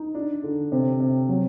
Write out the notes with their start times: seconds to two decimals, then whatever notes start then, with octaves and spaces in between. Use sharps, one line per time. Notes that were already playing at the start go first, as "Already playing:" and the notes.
Already playing: D#4
0.15 D4
0.43 D3
0.72 C3
1.00 C3
1.29 F#3